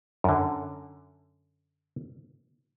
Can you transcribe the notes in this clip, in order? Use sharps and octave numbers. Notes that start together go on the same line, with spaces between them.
F#2 D3